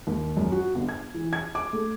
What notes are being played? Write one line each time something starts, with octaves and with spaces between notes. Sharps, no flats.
D#2
F#2
F#4
G1
G#6
E3
G#6
D6
A3